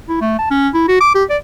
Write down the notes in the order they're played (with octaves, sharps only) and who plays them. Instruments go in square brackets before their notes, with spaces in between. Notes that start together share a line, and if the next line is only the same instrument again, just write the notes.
[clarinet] E4
A3
A5
C#4
E4
F#4
D6
G4
D5